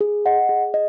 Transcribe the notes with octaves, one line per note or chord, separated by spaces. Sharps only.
G#4
D#5 F#5
G#4
D#5